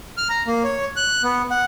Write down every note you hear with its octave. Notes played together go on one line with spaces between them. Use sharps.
F6
A#5
A#3
C#5
F#6
B3
F#5